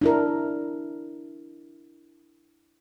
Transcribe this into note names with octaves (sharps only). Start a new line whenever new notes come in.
D4 E4 A#4